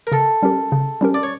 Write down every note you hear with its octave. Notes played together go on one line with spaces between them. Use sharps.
A#4
C#3 A4
G3 C#4 G4 A#4
C#3
G3 C#4 G4 A#4
D5
C#5